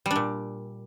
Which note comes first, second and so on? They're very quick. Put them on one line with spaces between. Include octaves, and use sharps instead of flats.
G3 D4 A#2